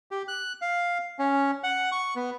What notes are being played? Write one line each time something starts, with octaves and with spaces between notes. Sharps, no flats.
G4
F#6
F5
C#4
F#5
C#6
B3